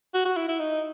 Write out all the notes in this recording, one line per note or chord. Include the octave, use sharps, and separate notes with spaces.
F#4
F#4
E4
E4
D#4